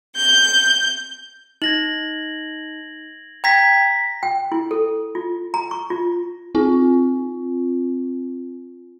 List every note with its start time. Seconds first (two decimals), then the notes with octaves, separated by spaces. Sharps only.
0.16 G6
1.62 D#4 G#6 A#6 F#7
3.44 G5 A#5 G#6 A#6 B6
4.23 G5
4.52 E4
4.71 A4
5.15 F4
5.54 A#5
5.71 C#6
5.90 F4
6.55 C4 F4